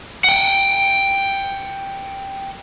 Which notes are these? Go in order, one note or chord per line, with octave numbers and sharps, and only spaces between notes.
F#5 G5